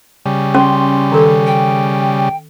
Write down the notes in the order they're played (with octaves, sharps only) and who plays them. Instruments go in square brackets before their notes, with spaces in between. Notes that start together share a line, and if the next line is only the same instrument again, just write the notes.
[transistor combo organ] C#3 G3
[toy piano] C#4 [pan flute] C6
[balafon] D#3 A4
[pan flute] G5